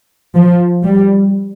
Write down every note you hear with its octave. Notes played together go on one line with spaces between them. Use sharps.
F3
G3